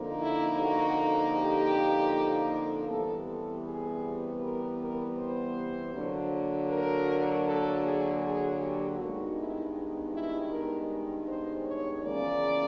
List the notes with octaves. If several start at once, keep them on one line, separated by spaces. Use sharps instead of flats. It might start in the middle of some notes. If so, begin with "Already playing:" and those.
Already playing: F2 D3 F3 A#3 D#4
E4
F#4
G4
C3 E3 G3 B3 A4
A4
G#4
A#4
A#4
C5
D3 F#3 A#3
A#4
A4
G#4
G#4
G4
G2 D#3 G#3 B3 F#4
E4
E4
A#4
C5
C#5
E2 C#3 F3 A#3 C#4 D5